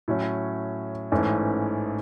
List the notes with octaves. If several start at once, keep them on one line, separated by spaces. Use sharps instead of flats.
A2 F#3 C#4
A1 G#2 E3 A3 C#4